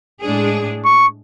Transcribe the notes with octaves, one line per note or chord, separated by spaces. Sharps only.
A2 G#3 D4 G#4
C#6